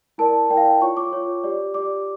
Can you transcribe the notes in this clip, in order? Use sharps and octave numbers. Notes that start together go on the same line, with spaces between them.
E4 A#4 D5 A5
E4 A#4 D5 G5
F5
G5
F4 C#5 C#6
D6
F4 C#5
G4 D5
G4 D5 D6